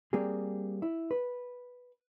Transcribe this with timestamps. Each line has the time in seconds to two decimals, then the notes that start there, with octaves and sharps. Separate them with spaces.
0.13 G3 A#3 C4 G#4
0.82 E4
1.11 B4